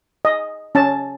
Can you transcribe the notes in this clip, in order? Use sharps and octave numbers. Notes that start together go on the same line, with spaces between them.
D#5
C#4 A5